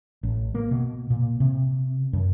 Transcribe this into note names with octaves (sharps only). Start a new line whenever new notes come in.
A1
A#3
B2
A#2
C3
F#2